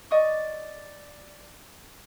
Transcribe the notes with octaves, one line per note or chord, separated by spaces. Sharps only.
D5 D#5 C#6